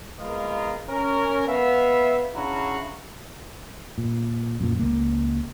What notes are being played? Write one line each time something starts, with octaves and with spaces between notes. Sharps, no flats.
G#3 A#3 B3 F4 A#4 D#5
C#4 A#4
B3 E5 F5
C#3 D4 E4 F#4 F5 A#5
A#2
F#2 A#2
C#2 A#3